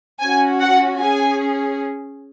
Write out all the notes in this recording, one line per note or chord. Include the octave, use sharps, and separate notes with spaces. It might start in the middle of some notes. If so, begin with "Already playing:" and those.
C#4 F#4 G#5
F#5
C#4 G#4 G#5